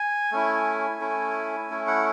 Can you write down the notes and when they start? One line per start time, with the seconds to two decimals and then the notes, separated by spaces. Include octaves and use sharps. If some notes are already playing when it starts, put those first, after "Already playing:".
Already playing: G#5
0.32 A3 C#4 E4
1.00 A3 C#4 E4
1.70 A3 C#4 E4
1.87 F#5